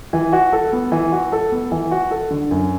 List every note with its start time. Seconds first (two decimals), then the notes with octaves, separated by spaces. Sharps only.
0.13 E3
0.33 F#4
0.52 A4
0.73 B3
0.92 E3
1.12 F#4
1.32 A4
1.52 B3
1.71 E3
1.91 F#4
2.11 A4
2.31 D3
2.51 F#2